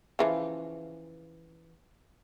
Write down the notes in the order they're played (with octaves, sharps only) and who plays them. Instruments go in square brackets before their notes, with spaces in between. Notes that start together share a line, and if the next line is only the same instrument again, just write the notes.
[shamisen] C#3 E3 F3